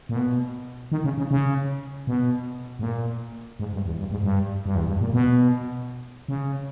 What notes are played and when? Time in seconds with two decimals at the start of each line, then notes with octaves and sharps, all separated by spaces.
0.09 A#2
0.15 B2
0.92 D#3
1.04 C#3
1.18 C#3
1.31 C#3
2.07 B2
2.79 G#2
2.83 A#2
3.60 G#2
3.73 G2
3.86 E2
3.99 G2
4.11 G#2
4.24 G2
4.66 G2
4.76 E2
4.88 G2
5.01 A#2
5.14 B2
6.28 C#3